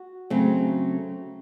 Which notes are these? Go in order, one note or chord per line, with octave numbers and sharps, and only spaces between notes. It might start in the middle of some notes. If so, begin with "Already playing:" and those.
Already playing: F#4
C#3 F#3 A3 C4